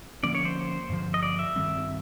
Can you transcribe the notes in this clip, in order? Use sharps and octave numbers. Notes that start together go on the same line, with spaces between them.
D3 F3 A#3 C#4 D5
C#5
C5
G2 D3 F3
D#5
D5
E5
G2 D#3 G3 C4